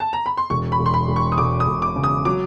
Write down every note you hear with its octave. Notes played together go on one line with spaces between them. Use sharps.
A5
A#5
B5
C6
E1 C#6
B5
E1
C6
B5
E1
C#6
D#6
E1 D6
D#6
E1
D6
C#3
D#6
F#3 D6